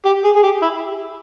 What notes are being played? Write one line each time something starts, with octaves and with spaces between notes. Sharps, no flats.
G4
G#4
G#4
G4
E4